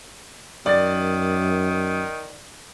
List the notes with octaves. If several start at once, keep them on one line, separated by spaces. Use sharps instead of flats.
F#2 D#3 D5 A6